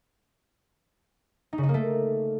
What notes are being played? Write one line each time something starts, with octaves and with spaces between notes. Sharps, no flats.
D#4
C#3
D#4
A#3
A3